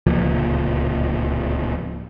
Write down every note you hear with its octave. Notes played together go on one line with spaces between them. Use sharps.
D1 C#2 A#2 F3